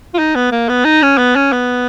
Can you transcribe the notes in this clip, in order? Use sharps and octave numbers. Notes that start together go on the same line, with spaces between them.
F4
D#4
B3
A#3
B3
D#4
C#4
B3
C#4
B3